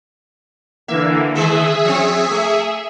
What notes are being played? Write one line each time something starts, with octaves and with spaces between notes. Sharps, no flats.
D3 E3 A#3 E5
D#3 G#3 A3 G#4 E5
F3 C4
A3